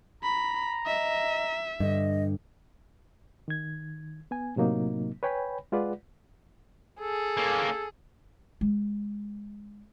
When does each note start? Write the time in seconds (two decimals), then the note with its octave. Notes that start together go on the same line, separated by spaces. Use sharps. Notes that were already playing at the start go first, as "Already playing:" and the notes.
0.23 A#5 B5
0.86 D#5 E5
1.80 G2 D3 D#5
3.48 D#3 G#6
4.31 B3 G#5
4.56 A2 C3 F#3 A#3 D#4
5.23 B4 C#5 G5 G#5 B5
5.72 G#3 F4 G#4 B4 D5 F#5
7.00 G#4 A4
7.37 A#3 C#4
8.61 G#3